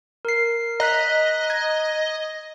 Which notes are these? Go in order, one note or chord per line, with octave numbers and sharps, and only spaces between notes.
A#4 C7
D#5 A#5 F#6 B6
G#6